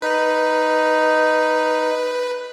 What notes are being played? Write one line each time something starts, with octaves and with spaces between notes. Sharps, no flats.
D#4 B4